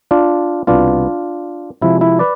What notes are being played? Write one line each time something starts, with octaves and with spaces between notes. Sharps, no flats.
D4 F4
C2 B2 B3 D4 F4
C3 F3 G#3 E4
E4
B4 D5